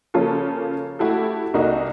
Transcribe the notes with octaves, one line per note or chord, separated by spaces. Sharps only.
C#3 F3 A#3 C#4 F4 A4
A3 E4 F#4 G4 A4
C2 A#3 D#4 F#4